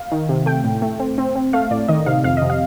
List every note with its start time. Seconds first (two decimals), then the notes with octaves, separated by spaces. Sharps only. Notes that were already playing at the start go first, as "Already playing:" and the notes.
Already playing: F5
0.12 D#3
0.29 C3
0.46 A3 G5
0.64 A2
0.82 A3
0.99 C4
1.18 C4
1.36 C4
1.53 A3 F5
1.71 A2 D5
1.88 D#3 D#5
2.06 C3 F5
2.24 F2 F5
2.37 D#5
2.42 C3
2.50 F5